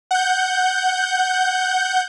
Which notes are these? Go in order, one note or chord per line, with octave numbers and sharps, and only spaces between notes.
F#5 G6